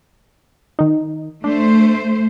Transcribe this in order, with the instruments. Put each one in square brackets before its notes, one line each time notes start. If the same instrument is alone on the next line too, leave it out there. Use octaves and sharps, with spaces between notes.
[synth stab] D#3 D#4
[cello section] A3 C5 [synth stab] D4